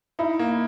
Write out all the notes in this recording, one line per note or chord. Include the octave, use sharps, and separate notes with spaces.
D#4 E4
A#3